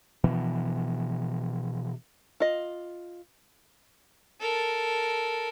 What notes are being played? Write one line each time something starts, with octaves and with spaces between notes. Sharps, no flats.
B2 E3 F3
F4 D#5
A4 A#4